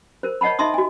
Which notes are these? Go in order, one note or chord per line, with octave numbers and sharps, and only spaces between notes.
A#4 C5
C#5 D#5 F#5 A5 B5
D#4 D#5 E5 A5 C6 D#6
F#4 G#5